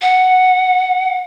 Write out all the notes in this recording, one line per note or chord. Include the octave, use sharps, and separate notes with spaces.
F#5